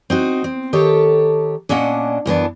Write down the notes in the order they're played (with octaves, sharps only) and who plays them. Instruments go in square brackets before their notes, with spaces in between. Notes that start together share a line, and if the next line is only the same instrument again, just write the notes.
[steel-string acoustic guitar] C4 D#4 F#4
C4
D#3 G4 A4 C#5
A#2 C#4 D4 D#5 F#5
F#2 E3 B3 D4